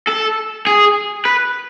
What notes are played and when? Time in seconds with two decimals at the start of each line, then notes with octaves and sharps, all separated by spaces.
0.08 A4
0.67 G#4
1.25 B4